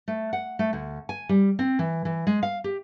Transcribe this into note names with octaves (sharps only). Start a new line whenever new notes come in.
A3
F#5
A3
D2
G#5
G3
C4
E3
E3
G#3
F5
G4